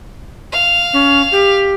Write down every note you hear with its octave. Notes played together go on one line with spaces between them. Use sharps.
F5
C#4
G4